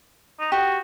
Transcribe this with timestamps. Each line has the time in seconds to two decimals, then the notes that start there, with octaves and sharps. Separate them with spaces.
0.40 D#4
0.52 F#4 G4